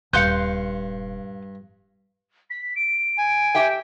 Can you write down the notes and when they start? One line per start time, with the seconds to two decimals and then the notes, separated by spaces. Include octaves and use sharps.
0.13 D#1 G2 F5 C6 F#6 G6 C#7
2.50 B6
2.76 D7
3.18 G#5
3.55 G4 E5 G5